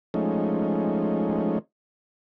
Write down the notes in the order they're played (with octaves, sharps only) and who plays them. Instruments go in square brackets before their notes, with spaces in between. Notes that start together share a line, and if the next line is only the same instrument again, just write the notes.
[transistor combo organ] F3 G#3 A3 C#4 D#4